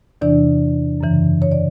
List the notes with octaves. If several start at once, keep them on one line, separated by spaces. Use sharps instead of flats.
E2 C3 E3 D4 D5
F#2 C#3 E3
C#5
D5